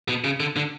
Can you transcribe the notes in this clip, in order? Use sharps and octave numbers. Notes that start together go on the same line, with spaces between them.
B2
C#3
D3
D3